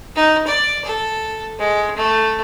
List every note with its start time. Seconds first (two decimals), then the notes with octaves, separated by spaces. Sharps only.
0.16 D#4
0.47 D5
0.85 A4
1.59 G#3
1.96 A3